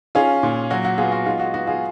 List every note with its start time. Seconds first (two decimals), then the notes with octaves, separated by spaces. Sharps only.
0.15 C#4 F4 G#4
0.43 A#2
0.71 F#3 F#4
0.85 F#4
0.98 B3 F4 G#4
1.12 F#4
1.26 G#3 F4
1.39 F#4
1.54 B3 F#4
1.67 F4 G#4